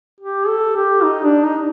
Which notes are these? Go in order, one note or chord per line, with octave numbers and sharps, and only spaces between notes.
G4
A4
G4
D#4
D4
D#4